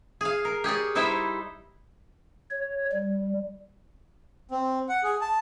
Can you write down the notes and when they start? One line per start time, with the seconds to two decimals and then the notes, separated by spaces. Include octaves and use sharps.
0.21 G#4 F5
0.45 A#4
0.64 G4 G#4 C#5 D5
0.95 G3 D#4 E4 C5 E5 G5
2.51 C#5
2.92 G3
4.51 C4
4.89 F#5
5.04 G#4
5.21 A5